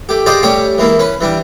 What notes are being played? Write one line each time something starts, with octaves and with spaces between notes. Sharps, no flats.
A3 G4
F4 G4 G#4 C5 D5 D#5
G3 A3 C#4 G4 C#5
E3 G#3 A#3 E4
C#4 B4
E3 G3 D4